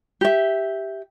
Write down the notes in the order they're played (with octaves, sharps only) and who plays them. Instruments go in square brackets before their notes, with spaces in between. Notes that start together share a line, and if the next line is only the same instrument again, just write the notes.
[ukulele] G4 E5